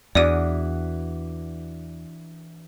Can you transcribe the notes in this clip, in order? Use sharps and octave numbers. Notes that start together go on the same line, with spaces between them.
E2 E3 D4 F#4 D5 D#7